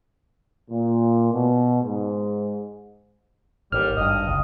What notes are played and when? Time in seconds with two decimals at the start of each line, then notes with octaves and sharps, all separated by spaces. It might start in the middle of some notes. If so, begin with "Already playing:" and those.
0.70 A#2
1.33 B2
1.83 G#2
3.72 A1 D#2 G3 F6
3.96 G#1 G2 D#5 D#6
4.27 F#1 C#2